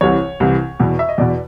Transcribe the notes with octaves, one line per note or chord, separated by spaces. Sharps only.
C2 C3 E3 C#5
C2 C3 E3
E2 B2
E5
D#5
E2 B2 D5